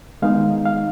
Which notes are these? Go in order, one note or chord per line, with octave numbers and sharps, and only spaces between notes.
D#3 G#3 B3 D#4 F5
F5